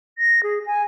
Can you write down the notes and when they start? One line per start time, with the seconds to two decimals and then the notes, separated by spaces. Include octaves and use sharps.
0.18 A#6
0.43 G#4
0.66 G#5